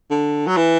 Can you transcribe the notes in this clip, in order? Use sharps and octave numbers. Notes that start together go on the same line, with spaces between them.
D3
F#3
E3